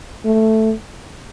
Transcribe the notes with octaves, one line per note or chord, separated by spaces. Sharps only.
A3